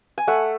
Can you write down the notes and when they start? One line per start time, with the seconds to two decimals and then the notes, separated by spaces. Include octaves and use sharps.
0.18 G#5
0.28 A3 F#5